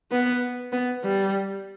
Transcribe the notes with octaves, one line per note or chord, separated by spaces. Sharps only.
B3
B3
G3